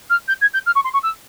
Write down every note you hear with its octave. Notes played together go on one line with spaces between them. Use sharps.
F6
G6
G#6
G6
F6
C#6
C6
C#6
E6